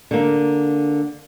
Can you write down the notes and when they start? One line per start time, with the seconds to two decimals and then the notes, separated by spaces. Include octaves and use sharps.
0.11 D3 A#3